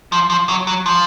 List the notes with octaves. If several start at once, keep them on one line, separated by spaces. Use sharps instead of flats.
F3
F3
F#3
F#3
F3